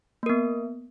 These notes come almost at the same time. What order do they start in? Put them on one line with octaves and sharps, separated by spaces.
A#3 A#4 B3